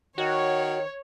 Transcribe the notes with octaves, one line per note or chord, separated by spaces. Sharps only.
D#3 F#4 C#5